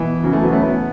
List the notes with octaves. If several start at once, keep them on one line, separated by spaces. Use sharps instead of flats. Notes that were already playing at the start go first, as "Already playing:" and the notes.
Already playing: B2 E3
C#3 F#3
E3 A3
F#3 B3
A3 C#4
B3 E4